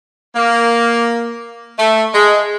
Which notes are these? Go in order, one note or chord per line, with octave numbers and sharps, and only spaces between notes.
A#3
A3
G#3